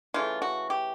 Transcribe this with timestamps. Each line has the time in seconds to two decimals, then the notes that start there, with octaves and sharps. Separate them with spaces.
0.14 C#3 E3 A3 F4
0.42 F#4
0.70 G4